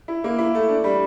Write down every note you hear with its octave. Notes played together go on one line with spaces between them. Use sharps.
E4
A#3
E4
A3
D4
G3